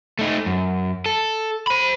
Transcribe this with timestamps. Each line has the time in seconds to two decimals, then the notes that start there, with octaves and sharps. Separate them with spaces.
0.19 A3 D#4
0.46 F#2
1.06 A4
1.67 C5 B5